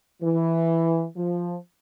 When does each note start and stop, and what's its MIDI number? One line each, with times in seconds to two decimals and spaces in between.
0.22 1.04 52
1.17 1.55 53